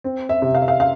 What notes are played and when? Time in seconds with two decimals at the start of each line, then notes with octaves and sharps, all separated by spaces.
0.04 C4
0.29 E5
0.42 C3
0.55 F5
0.62 E5
0.68 F5
0.80 F5